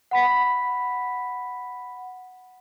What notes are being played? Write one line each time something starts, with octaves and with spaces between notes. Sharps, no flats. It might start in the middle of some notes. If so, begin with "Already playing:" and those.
F#5 B5 B6